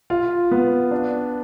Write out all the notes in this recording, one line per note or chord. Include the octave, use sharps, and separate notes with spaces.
F4
B3
D4